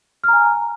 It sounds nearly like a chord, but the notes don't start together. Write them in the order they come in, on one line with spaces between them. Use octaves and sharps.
F6 A#5 G#5